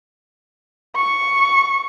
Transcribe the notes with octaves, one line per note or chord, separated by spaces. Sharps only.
C#6